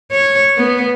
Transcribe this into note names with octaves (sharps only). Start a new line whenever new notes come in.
C#5
B3